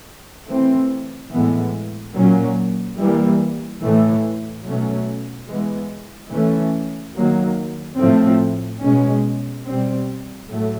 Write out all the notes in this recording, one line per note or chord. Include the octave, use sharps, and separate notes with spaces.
E3 A3 C4
A2 E3 G#3 B3
A#2 F#3 A#3 C#4
E3 G3 A#3
A2 E3 A3
B2 F#3 A3 C#4
E3 G#3 B3
E3 A3 C#4
D#3 F#3 A#3
A2 F3 A3 C4
B2 G#3 C#4
B2 G3 C4
A2 F#3 A3